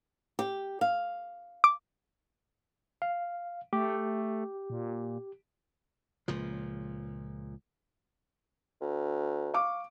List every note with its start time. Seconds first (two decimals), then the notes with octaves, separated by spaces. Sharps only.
0.39 G4
0.81 F5
1.64 D6
3.02 F5
3.73 A3 G4
4.70 A#2
6.28 C#2 A#2 F3
8.81 D2
9.54 F5 C#6 D6